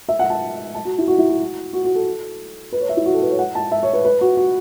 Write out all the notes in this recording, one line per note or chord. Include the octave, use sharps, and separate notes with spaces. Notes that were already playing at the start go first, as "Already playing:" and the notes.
E5
F#5
A5
A5
F#4
E4
F#4
E4
F#4
F#4
F#4
A4
B4
C#5
E5
E4
F#4
A4
B4
C#5
F#5
A5
E5
C#5
B4
B4
F#4
F#4